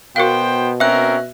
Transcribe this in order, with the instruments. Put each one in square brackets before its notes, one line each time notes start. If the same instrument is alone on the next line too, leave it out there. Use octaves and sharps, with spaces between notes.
[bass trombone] B2 [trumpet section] B3 C5 G5 [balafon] F#4 A#4 F5
[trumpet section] C4 C#4 A#4 [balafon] F#4 [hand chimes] E5 F#6